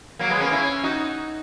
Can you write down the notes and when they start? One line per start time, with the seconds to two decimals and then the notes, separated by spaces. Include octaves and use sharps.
0.19 F#3 A#3
0.30 G#3 B3
0.41 A#3 C#4
0.52 C#4 E4
0.83 D#4 F#4